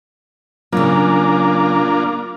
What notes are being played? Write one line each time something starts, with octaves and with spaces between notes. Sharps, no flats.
C#3 F#3 A#3 D4 F4